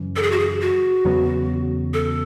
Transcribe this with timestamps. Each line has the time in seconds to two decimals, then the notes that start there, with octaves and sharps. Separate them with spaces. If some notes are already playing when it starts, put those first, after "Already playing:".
Already playing: F#2 C#3 E3
0.16 A4
0.23 G#4
0.32 F#4
0.39 G#4
0.61 F#4
1.05 E2 C#3 F#3 B3
1.94 A4